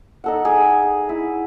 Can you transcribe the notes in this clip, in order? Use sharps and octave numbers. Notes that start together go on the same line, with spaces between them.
D#4 A4 F#5
G#4
E4